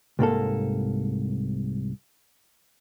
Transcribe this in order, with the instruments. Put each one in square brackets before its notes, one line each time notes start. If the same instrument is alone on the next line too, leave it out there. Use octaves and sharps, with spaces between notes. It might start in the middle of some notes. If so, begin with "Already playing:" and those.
[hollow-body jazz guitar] C2 G#2 A#3 A4